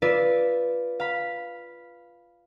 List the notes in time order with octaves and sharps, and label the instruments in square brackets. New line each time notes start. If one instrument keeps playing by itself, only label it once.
[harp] F4 B4 D5 E5
F5 B5